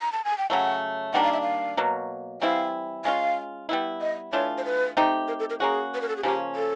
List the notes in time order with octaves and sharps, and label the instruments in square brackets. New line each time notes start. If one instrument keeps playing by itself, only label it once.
[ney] A#5
A5
G#5
G5
[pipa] C#3 F#3 A3 [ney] F#5
[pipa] D#3 G3 A#3 D4 [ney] F#5
[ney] F5
E5
F5
[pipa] B2 F#3 A#3
[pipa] E3 G3 C4 E4 [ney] F5
[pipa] G#3 C#4 F4 [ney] F5
[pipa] G3 B3 E4
[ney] D#5
[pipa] E3 A3 D4 F4 [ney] C#5
[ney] C5
B4
[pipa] A3 C4 D#4 G4
[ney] A#4
A4
A#4
[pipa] A#3 C#4 F#4 [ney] G#4
[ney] B4
A#4
A4
G#4
[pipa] C#3 F3 A#3 C#4 [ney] G4
[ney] A4